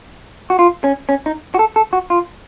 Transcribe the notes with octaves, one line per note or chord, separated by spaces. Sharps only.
F#4
F4
C#4
C#4
D#4
F#4
A4
A4
F#4
F4